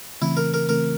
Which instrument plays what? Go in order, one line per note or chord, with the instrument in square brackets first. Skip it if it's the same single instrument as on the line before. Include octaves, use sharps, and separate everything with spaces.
[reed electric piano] C#3 E3 A3 C4 [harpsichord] E4
[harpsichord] A#4
A#4
[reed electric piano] C#3 E3 A3 C4 [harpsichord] A#4